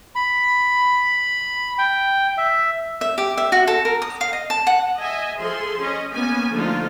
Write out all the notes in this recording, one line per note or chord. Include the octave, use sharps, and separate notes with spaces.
B5
G5
E5
E5
G4
E5
F#4
A4
A#4
D#6
F5
D#5
A5
F#5
D#5 E5 G#5
F3 G#4 A4 C6
C#4 D#5
A#3 B3 C#4 G#5
D3 F3 A3 A#3 D#4 F4